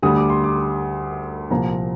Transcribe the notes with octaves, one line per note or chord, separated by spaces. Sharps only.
D2 D3 G3 D#6
D6
C6
D6
C2 A#2 F3 A#3 A#5